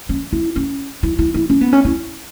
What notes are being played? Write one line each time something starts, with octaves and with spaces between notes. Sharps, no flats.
C#4
E4
C#4
E4
E4
E4
C#4
B3
C#4
E4